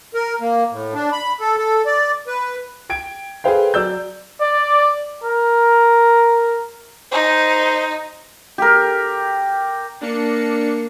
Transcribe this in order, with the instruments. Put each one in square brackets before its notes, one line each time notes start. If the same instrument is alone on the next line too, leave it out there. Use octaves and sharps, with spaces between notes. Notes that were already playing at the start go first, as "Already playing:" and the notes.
[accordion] A#4
A#3
A2
D4
B5
A4
A4
D5
B4
[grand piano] G5 G#6 D7
G#4 A4 B4 C5 F5 G5
F#3 D5 E6 G6
[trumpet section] D5
A#4
[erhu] D#4 [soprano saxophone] C5
[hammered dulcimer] G4 A#4
[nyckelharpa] A#3 [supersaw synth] D4 C#7